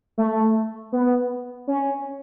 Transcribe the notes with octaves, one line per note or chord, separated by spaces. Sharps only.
A3
B3
C#4